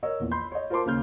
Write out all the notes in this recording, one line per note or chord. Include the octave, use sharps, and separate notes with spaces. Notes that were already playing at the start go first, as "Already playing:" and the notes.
A#4 C#5 D#5 E6
A#1 E2
B5 C6 G6
C#5 D#5
F4 A#4 C5 A5 C6 D6
D#2 C#3 F6 G6